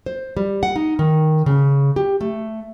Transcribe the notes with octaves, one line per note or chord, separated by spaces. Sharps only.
C5
G3
F#5
D#4
D#3
C#3
G4
A3